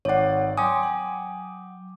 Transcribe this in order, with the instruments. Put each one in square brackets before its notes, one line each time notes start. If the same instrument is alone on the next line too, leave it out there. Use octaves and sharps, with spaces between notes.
[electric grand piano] G#1 D5 [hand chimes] C#5 F#5
[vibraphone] F#3 C#5 C6 [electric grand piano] G5 D6 D#6 [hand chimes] G#5
[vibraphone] F#3 F#5